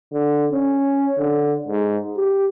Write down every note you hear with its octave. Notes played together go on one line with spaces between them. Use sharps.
D3
C#4
D3
G#2
G4